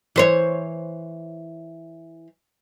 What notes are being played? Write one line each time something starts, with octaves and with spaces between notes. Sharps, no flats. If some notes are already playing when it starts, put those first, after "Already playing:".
E3 C5 C#5